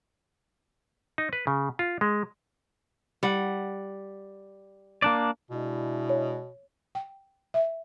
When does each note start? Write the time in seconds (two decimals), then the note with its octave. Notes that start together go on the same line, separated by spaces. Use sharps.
1.18 D#4
1.33 B4
1.47 C#3
1.79 F4
2.01 G#3
3.23 G3 F#5
5.02 A#3 D4 D5
5.51 B2 G#3 D4 E4
6.10 C#5
6.95 G5
7.54 E5